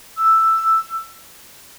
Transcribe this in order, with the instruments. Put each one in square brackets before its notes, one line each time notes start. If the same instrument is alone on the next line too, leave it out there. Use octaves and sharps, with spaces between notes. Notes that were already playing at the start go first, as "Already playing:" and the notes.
[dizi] E6